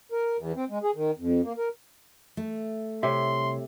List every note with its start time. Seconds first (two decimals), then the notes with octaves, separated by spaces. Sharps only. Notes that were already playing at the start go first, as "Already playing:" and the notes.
0.12 A#4
0.38 E2
0.56 C4
0.70 G#3
0.83 G#4
0.95 D#3
1.18 F2
1.44 A#3
1.58 A#4
2.37 A3
3.03 C2 C3 C#5 E5 C6